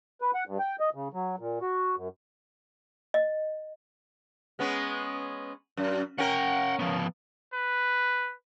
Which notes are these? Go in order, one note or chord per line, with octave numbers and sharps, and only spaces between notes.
B4
F#5
G2
G5
D#5
C#3
F#3
A#2
F#4
F#2
D#5
G#3 B3 C#4
F#2
C#4 A#4 F#5 G5
F3 B3
B4